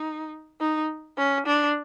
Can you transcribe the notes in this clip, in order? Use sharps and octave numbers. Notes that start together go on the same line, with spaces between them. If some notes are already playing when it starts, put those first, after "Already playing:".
Already playing: D#4
D#4
C#4
D4